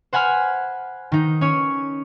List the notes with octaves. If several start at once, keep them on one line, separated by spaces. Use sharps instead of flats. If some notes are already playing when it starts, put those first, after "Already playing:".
C5 F#5 G#5 B5 F6
D#3 D#4
C#4 C#5